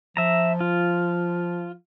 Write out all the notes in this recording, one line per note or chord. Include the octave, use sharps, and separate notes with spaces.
F3 E5 A#5
F4